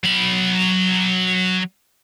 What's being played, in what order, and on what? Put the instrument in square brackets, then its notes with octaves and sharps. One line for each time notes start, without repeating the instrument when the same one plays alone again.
[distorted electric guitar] F#3 B5